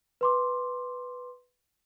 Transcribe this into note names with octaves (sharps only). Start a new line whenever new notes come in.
B4 C6 D6